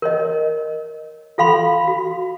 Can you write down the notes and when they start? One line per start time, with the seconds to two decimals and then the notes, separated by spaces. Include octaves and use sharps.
0.02 A#4 C#5 D#5
1.38 F4 A4 F5 B5 C6
1.87 F#4